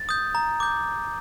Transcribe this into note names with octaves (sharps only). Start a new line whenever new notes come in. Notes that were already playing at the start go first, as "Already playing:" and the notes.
Already playing: A6
D#6 G6
A#5
D6 G6